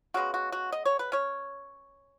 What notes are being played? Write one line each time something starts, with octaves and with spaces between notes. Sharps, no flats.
C#3 G#3 B3 F#4
F#4
F#4
D#5
C#5
B4
C#4 C#5